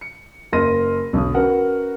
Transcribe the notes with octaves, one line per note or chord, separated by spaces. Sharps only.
C#7
F#1 A#4 D#5 C6 A#6 D#7
B1 D3 D#6
C#4 F#4 A#4 B4 F#5